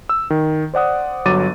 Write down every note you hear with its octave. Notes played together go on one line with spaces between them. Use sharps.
E6
D#3
C5 D5 F#5 D#6
G1 F#3 D6 A6 D#7